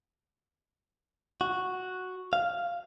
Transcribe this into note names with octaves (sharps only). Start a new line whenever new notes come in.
F#4
F5